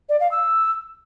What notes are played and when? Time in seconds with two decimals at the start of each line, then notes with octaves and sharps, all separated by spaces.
0.09 D5
0.20 F5
0.31 E6